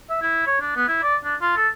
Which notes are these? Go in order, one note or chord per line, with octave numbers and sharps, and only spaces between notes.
E5
E4
C#5
D4
B3
E4
D5
D4
F4
A4